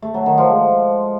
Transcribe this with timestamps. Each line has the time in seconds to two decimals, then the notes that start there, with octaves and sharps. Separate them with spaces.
0.02 A3
0.14 F#3
0.26 D#3
0.38 F3
0.50 G#3